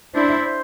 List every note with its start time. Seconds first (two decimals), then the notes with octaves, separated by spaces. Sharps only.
0.15 D4 E4 C5
0.45 C5